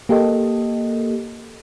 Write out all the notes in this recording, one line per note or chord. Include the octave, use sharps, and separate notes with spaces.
A#3 G4 A4 D#5